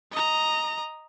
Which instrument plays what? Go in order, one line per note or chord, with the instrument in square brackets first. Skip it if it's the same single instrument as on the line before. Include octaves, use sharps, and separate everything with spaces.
[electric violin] D#5 A#5